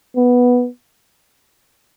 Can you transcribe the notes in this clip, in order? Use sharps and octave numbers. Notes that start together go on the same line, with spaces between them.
B3